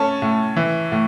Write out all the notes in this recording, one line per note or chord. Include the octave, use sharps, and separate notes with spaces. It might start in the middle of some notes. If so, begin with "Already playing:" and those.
Already playing: A3 C#4 A5
A2
E3
A2